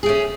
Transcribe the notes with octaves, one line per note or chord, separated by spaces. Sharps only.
A3 C#4 G#4